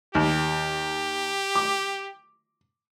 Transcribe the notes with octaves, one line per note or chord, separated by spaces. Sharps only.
D#2 G4
D6